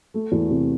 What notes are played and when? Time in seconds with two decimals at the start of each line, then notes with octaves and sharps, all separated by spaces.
0.14 A3
0.32 E2
0.50 C3